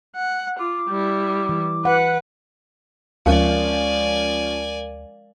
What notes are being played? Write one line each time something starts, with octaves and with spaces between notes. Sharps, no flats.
F#5
F4 D6
G3 E4
E3
B4 F#5
D2 F3 G#3 C#4 A#4 D5 F5 G#5